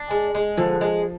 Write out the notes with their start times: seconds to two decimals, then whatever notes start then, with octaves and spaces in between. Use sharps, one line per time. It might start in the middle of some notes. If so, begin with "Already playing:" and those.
Already playing: D4
0.11 G#3
0.35 G#3
0.57 D3 F3
0.81 G#3